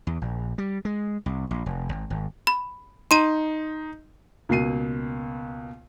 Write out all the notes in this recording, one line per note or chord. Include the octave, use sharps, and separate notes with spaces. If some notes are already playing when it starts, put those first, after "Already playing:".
E2
A#1
G3
G#3
C2
A#1
F1
G#1
G#1
B5
D#4 A#5 C6 D#7 E7
C#2 B2 A#3 C7 D#7